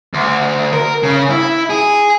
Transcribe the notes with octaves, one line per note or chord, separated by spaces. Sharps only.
D2
A#4
C#3
E4
G#4